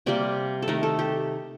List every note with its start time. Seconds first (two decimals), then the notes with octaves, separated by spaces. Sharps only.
0.06 C3 G3 A#3 D5
0.62 A4
0.68 D#3 A3 A#4
0.83 A4
0.99 G4